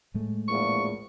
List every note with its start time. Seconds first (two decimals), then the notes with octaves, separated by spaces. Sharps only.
0.14 A2 G#3 A3
0.48 A#1 E2 A#2 C#6